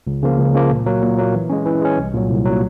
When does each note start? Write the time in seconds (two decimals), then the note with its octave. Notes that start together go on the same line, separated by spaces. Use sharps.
0.07 C#2
0.23 C#3 F3 A#3
0.38 C#2
0.54 C#3 F3 A#3
0.70 A#2
0.86 F#3 A#3
1.02 A#2
1.18 F#3 A#3
1.34 E3
1.49 G#3 C#4
1.66 E3
1.81 G#3 C#4
1.98 C2
2.13 A#2 F#3
2.30 C2
2.45 A#2 F#3